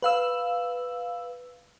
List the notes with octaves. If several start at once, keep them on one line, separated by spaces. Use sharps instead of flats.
B4 F5 E6